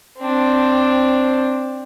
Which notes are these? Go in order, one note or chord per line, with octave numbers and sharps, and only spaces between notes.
C4 D4